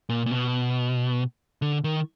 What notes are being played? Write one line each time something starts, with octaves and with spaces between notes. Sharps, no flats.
A#2
A#2
B2
D3
D#3